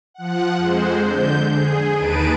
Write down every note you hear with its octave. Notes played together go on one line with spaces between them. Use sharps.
F3 F#5
F2 G#3 C5
D3 G6
G#4
D#2 D#4 B4 A5 D7 D#7